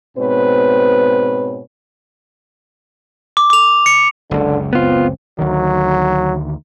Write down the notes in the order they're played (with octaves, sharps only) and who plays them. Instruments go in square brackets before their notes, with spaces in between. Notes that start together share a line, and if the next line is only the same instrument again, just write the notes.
[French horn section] G#2 B2 C4 B4 C#5
[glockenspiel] D6
D6 F7
C#7
[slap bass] F#1 C#2 [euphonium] D3
[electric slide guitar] B3 F4 [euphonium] C4
[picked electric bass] D2 D#3 [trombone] F#3